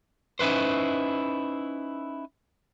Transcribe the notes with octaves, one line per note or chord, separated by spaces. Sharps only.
C#4 D#4 E4 B4 C5